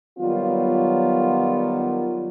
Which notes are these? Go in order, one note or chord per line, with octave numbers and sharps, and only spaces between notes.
D#3 F#3 G3 B3 F4